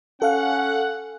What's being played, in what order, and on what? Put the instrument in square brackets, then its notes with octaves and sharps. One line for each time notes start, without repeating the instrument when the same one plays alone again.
[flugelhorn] C#4 [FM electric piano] A4 F5 [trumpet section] F#5